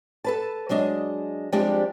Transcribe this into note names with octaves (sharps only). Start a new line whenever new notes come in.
A4 B4 A5
F#3 G#3 D4 D#5
F3 G3 G#3 C4 D4 G4